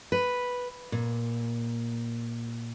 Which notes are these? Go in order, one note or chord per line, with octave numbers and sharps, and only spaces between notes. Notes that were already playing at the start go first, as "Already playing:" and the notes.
B4
A#2